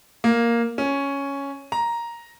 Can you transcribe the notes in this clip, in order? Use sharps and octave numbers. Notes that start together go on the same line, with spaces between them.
A#3
C#4
A#5